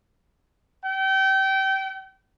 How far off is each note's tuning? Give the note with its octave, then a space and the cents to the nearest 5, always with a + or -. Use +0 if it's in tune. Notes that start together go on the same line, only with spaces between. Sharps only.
G5 -30